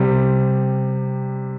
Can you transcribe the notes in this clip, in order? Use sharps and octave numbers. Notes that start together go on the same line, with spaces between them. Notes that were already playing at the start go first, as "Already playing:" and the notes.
Already playing: C3 G3